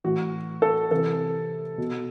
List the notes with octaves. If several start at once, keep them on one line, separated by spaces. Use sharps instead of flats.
A2 E3 F#4
A4
C3 E3 A4
B2